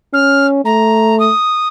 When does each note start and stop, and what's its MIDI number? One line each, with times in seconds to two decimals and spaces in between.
0.14 0.61 61
0.14 0.47 89
0.65 1.31 57
0.65 1.18 82
1.20 1.68 87